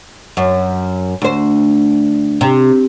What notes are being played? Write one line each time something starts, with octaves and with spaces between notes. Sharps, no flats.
F#2
D2 C5
C3